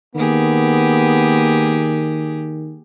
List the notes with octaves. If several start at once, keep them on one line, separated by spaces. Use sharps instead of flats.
D#3 A#3 B3 G4 G#4